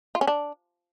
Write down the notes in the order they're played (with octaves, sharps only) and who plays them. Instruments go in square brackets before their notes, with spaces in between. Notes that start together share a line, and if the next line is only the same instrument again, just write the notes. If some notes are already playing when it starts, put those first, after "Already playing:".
[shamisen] F4
C#4
D4